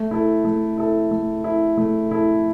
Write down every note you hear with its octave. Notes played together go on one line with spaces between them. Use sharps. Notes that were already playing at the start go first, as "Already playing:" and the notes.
Already playing: A3
E4 A4
A3
E4 A4
A3
E4 A4
A3
E4 A4